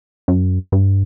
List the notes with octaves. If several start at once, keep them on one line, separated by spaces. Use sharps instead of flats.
F#2
G2